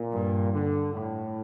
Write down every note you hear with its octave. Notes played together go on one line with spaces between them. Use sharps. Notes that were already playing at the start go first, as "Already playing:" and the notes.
Already playing: A#2
G2
D3
A2